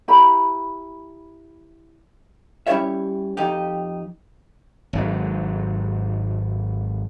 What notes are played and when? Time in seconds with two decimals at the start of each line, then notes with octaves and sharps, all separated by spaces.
0.08 E4 G4 A#5 B5
2.67 G3 C#4 E4 G4 C#5 E5
3.37 F2 D#4 G4
4.93 G#1 G#2 F#3